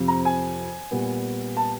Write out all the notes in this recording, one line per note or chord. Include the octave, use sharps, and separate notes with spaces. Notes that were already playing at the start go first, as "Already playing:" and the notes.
Already playing: F2 C3 F3
A#5
G#5
A#2 G3 B3
A5